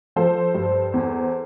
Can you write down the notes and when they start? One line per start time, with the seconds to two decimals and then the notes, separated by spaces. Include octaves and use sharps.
0.16 F3 A4 C5
0.55 G2
0.94 E2